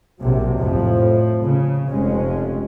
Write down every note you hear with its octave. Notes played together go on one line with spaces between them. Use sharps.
A#1 C3 F#3
F2 A2 F3
C#3
F1 F2 G#3 C#4